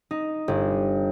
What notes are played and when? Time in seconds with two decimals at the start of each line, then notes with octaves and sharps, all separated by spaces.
0.11 D#4
0.48 G1